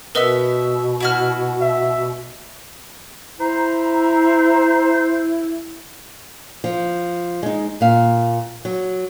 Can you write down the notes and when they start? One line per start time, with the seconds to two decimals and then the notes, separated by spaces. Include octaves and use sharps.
0.15 B2 B3 A#4 B4 D#5 E5
1.00 E4 F#4 F6
1.62 E5
3.40 E4 C5 A#5
6.64 F3
7.43 G#3 D#4
7.81 A#2 F5
8.65 F#3